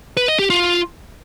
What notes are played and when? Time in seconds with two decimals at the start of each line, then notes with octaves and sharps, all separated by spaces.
0.17 B4
0.28 D#5
0.39 G4
0.50 F4